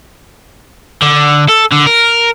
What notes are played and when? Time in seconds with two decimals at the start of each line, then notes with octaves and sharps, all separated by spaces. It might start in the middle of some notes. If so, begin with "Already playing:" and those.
1.02 D3
1.49 A4
1.72 D3
1.87 A#4